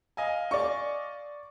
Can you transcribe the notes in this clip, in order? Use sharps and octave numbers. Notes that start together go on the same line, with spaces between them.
D#5 F5 G#5
D5 C#6